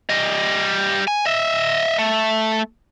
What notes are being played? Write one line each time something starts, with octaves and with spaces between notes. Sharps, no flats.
G3 D#5
G#5
D#5 E5
A3